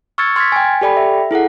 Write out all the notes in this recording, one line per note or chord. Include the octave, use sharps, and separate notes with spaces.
C#6 E6 F6 G#6 A6 C#7
C6 F6 G#6 A6 B6
G5 G#5
G4 A4 D5 G5 B5
E5
E4 G#4 A4 F#5